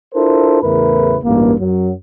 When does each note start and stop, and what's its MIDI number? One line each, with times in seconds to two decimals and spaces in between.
0.15 0.62 62
0.15 0.62 64
0.15 0.62 65
0.15 0.62 69
0.15 0.62 70
0.15 0.62 72
0.63 1.16 40
0.63 1.16 45
0.63 1.16 49
0.63 1.16 64
0.63 1.16 70
0.63 1.16 71
1.24 1.53 33
1.24 1.53 38
1.24 1.53 43
1.24 1.53 58
1.60 1.92 42
1.60 1.92 54